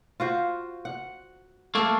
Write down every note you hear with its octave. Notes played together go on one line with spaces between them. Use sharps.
F4 F#4 C5
F#5
A3 A#3